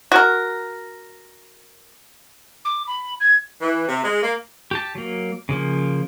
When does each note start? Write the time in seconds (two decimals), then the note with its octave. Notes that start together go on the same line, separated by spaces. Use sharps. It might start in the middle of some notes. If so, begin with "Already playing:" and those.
0.12 F#4 A#4
2.65 D6
2.87 B5
3.20 G#6
3.61 E3
3.89 C3
4.04 G#3
4.22 A#3
4.71 G4 A5
4.95 F#3 A#3
5.49 C#3 F3 A#3